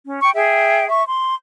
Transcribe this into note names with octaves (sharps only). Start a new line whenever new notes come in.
C#4
G5 C#6
G#4 E5 G5
E5 C#6
C6